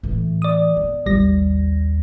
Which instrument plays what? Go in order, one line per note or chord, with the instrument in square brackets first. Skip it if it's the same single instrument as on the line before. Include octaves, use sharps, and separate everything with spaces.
[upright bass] A2 E3
[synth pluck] D5 D#6
[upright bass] B3
[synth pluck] A1 G3 A#6 [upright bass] D#2